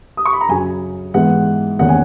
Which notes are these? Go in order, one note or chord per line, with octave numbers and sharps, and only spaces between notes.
D#6
C#6
B5
A#5
F#2 C#3 F#3 G#5
G#2 E3 G#3 B3 F#5
E2 D#3 A#3 C#4 F#5
G#5